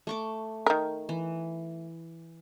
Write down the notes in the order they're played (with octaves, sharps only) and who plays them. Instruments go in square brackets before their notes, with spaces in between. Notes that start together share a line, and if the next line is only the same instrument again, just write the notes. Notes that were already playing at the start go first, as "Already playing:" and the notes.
[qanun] A3 C#6 D6
[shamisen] D#3 A#4
[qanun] E3